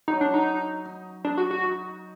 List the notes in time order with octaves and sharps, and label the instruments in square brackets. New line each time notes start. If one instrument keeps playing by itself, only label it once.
[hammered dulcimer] F#3 [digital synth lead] D#4
[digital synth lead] D4
D#4
[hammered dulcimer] D#4
[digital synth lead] D4 [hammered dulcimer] D#4
[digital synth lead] F#4
F#4
[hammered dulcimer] D#4